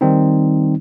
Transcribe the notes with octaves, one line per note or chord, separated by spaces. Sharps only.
D#3 G3 C4 D#4